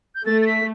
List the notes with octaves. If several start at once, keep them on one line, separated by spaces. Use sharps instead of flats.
G6
A3 A6
A6
B6